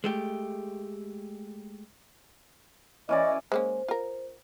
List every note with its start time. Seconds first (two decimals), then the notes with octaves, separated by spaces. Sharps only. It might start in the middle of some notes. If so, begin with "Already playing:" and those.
0.04 G#3 A3 G4
3.09 E3 C#4 D5 D#5
3.52 G#3 A#3 C#4 C5
3.88 F4 A#4